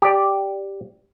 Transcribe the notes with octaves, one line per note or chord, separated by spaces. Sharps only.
G4 D5